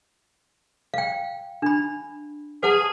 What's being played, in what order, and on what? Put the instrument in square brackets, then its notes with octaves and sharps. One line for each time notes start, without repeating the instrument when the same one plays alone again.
[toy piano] F5 G5
D4 B5
[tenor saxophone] G#4 [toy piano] B4 F#5 A5